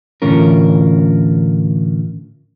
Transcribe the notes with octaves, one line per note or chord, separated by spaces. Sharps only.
A2 D3 E3 C#4 F4 A#4